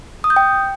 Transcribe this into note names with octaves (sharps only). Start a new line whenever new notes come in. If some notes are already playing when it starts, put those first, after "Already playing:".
D#6
G6
G5